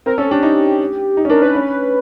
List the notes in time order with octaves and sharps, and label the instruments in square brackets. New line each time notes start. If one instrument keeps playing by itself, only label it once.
[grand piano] C4 [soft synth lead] A#4
[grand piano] C#4 [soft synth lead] A4
[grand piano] D4 [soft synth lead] G4
[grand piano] D#4
D#4
C#4
[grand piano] D4 [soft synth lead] A#4
[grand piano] C#4 [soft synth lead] B4
[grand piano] C#4